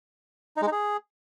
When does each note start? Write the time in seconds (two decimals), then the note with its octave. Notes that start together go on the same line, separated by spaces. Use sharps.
0.57 D#4
0.62 G#3
0.67 D#4
0.72 G#4